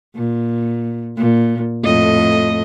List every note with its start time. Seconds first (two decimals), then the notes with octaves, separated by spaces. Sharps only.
0.15 A#2
1.17 A#2
1.84 F2 A2 D#5